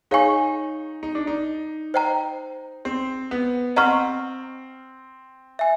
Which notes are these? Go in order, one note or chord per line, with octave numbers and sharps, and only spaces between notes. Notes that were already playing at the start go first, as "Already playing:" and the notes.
D#4 G#4 C#5 F5 G#5 C#6
D#4
D4
D#4
C5 D#5 G5 A#5
C4
B3
C4 D#5 F#5 A#5 C#6 F6
E5 G#5